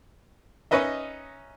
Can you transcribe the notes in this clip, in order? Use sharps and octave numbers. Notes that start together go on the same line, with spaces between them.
C#4 D#4 B4 D#5 E5